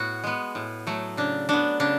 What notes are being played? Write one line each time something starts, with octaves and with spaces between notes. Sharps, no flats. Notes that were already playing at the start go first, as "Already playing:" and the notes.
Already playing: A2 B3 F#4
G#3 B3
A2
F#3 A3
C#3 D4
F#3 B3 D4
C#3 D4